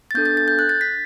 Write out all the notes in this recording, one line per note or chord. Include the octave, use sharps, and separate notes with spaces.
A6
B3 D4 A4 G6
A6
A6
G6
F#6
A6
B6